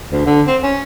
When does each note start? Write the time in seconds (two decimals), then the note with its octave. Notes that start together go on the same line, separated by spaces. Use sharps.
0.12 D2
0.26 D3
0.47 C4
0.63 C#4